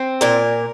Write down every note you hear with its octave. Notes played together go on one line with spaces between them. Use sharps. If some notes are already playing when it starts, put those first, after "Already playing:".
Already playing: C4
A#2 A#4